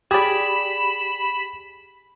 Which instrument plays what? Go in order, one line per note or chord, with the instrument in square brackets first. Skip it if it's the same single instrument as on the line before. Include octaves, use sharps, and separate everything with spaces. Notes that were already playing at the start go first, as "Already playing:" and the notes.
[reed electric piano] G4 [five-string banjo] G#4 D5 [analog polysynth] B5 [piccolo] E7